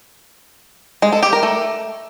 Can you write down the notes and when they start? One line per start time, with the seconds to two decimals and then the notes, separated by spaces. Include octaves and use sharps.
1.02 G#3
1.12 A4
1.23 G4
1.33 A#4
1.43 A3